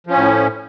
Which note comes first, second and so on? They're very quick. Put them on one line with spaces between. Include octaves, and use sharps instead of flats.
F3 C#4 A2